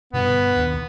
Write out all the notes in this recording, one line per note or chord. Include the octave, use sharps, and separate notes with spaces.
G2 B2 D3 B3
D#2